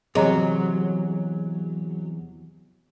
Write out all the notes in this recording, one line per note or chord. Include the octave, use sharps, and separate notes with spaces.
E2 A2 C3 F#3 G#4 D#5 A#5